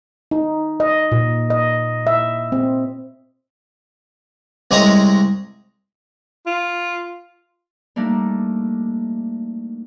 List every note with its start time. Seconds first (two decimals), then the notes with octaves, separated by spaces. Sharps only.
0.31 D#4
0.80 D#5
1.12 A#2
1.50 D#5
2.07 E5
2.52 C4
4.71 C2 G#3 G#4 C#5 D#5 A#5
6.46 F4
7.96 G3 A3 A#3 D4 D#4